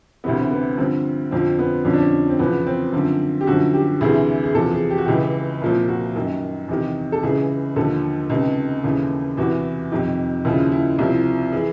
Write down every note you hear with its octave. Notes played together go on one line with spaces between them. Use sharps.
D2 C3 E3 B3
C4
B3
G2 D3 F3 C4
F2 D3 F3 C4
B3
F2 D3 F3 C#4
D4
C#4
C4
E2 C#3 F3 B3
C4
F#2 D3 F3
G4
F#2 D3 F3 F#4
G4
D2 C3 E3 G#4
G#4
E2 C3 F3 A4
G#4
G4
F#4
C#2 C#3 E3 G4
C2 A#2 F3
F#4
F#2 D#3
E2 C3 D#3
A4
C#2 C#3 E3 G#4
D#2 D3 F3 A4
C#2 C3 D#3
D#2 C#3 E3
E2 C3 E3 F#4
F2 C3 D#3
D#2 C#3 F3 E4
E4
C2 C3 F3 E4
E3 G#4